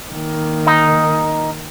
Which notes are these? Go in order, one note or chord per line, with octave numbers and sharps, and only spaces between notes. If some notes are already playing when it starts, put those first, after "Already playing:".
D#3 A#3
D#4